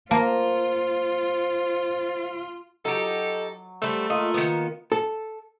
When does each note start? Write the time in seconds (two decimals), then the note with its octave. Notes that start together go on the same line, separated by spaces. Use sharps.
0.11 A#3 F4 A#4 C5 A5
2.85 F#3 D#4 G4 A4
3.82 G3 A3 C5
4.10 A#3 F4 D#5
4.34 D#3 B3
4.92 A4